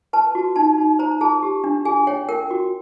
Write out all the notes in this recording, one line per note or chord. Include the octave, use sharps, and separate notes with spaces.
B4 A5
F#4
D#4 A5
D#4
C5 A#5
G#4 A5
G4
D4
G#4 G#5
C#5 G5
A#4 G5
F#4